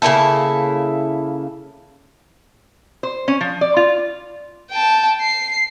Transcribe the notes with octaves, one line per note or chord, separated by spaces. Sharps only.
C#3 A#3 E4 A4
C5
C#4
F3
D5
F4
G5 A5
C7